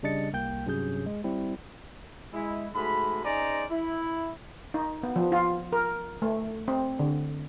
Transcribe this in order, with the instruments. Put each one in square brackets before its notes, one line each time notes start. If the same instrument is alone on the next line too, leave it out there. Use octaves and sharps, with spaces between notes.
[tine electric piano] C#3 G3 D4 D#5 A6 C#7
C2 A#3 G5 G6
G2 C3 F#3 C#4 G#4 G6
G#3
G3 C4 E4
[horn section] G#3 E4
G#2 A3 F#4 B5
C#4 D#4 G#4 C5 D5 A#5
E4
[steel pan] D#4
B3
F3
F4
A#4
A3
C4
D3